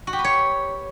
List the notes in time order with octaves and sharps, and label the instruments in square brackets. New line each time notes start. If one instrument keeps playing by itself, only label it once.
[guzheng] F#4
G4
B4
C#5